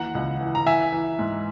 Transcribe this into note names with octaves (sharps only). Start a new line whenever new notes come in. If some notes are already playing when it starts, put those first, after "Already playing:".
Already playing: D#2 E3 F#5 A#5
C#2
E3
A#5
E3 E5 G#5
E3
G#2